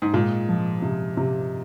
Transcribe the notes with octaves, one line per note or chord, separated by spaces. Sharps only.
G#2
A#2 G#3
F3
C3
C3